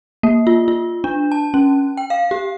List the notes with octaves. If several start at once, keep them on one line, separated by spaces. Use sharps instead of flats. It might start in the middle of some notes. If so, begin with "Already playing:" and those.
A#3
F4
F4
D4
A5
C#4
G5
F5
G4